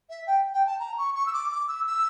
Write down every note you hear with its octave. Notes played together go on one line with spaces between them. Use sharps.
E5
G5
G5
A5
A#5
C#6
C#6
E6
D6
D6
E6
E6